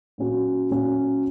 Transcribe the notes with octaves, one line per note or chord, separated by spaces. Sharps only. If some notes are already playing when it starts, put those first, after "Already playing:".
A#2 F#3 C#4 F#4
A#2 F#3 C#4 F#4